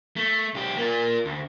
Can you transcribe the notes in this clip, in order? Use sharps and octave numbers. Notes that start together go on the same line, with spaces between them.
A3
B1 G4
A#3 F4
D2